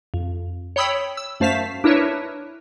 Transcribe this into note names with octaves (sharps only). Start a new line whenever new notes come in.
F2
C#5 G5 B5 D#6 E6 B6
E6
F#2 A3 C5 F5 B6 E7
D4 E4 A#4 B4 C#5 E5